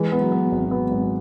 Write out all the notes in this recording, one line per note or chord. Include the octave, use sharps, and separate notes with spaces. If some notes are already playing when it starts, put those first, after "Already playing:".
Already playing: E3 G#3
B3
F#3
B3
G#1
B3
G#1